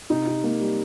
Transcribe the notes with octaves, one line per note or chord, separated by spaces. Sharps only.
C3 D#4
C3
A#3
G3